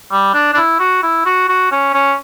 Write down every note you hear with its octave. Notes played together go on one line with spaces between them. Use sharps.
G3
D4
D4
E4
F#4
E4
F#4
F#4
C#4
C#4